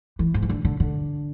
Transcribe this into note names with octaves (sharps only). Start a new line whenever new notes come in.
E3
G#2
E3
D3
D3
D3